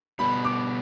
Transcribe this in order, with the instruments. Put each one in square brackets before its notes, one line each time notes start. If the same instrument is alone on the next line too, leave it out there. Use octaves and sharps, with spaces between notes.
[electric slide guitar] B2 G3 B3 [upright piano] B5
[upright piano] D6